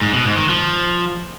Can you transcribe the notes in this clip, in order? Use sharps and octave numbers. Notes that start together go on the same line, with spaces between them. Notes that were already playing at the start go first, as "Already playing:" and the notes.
G#2
B2
G#2
D#3
F3